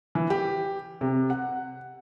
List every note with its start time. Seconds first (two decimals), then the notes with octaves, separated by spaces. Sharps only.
0.15 E3
0.30 G4
1.01 C3
1.30 F#5